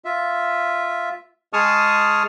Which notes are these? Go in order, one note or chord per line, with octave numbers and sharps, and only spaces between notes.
F4 E5
G#3 G#4 A5 C#6 D#6 F6